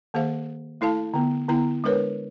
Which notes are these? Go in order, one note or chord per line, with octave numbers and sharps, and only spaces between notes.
D#3 A#3 G#4 C5 F5
A3 E4 A4 F5 A5
D3 B3
D3 B3 E4 A#5
G#3 D4 A#4 B4 C#5